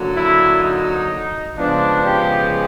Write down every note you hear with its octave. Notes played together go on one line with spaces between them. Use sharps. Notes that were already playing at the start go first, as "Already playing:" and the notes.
Already playing: D3 F#3 A#3
E4
D#4
C#3 F3 G#3 B3 D4
G4